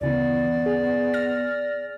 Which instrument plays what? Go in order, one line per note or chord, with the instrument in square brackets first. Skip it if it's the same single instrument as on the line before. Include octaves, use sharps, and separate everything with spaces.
[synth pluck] D2 C#3 E3 [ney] B3 [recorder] D5
[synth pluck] G#4
F6 A#6